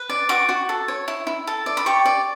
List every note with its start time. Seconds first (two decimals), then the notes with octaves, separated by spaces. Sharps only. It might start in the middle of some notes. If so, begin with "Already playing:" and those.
Already playing: B4
0.10 D5
0.29 F#4 D6
0.49 F#4
0.69 A4
0.88 C#5
1.08 E4
1.27 E4
1.47 A4
1.66 D5
1.77 B5
1.86 G4 C#6
2.06 D5